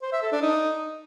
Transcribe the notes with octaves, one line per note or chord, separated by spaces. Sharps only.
C5
E5
A4
D4
D#4